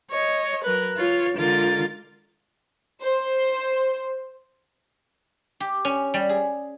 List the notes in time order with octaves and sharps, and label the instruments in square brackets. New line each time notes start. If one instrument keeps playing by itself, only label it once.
[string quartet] C#5 D#5
F#3 A#4 B4 F#6
F4 C#5
D3 G#3 F4 A#4 A6
[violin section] C5
[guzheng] G4
C#4
G3
G#4